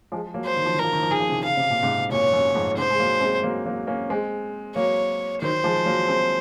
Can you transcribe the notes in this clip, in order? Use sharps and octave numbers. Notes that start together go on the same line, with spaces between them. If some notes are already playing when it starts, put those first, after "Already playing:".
F3 G#3
F#3 A#3
C5
D#3
F3
D#3
A#4
F3
D#3
F3
D#3 G#4
F3
C3 D#3
C#3 F5
C3
A#2
G#2 C3
F#2 A#2 C#5
F#2
F2 G#2
G#2 C3 C5
G#3
F#3 A#3
G#3 C4
F#3 A#3
F#3 A#3
A#3 C#4
G#3 C4
F#3 A#3 C#5
D#3 F#3 C5
F3 G#3
F#3 A#3
G#3 C4